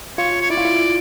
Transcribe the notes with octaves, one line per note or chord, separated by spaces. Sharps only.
F4 C#5
C#5
E4 D5
F4
E4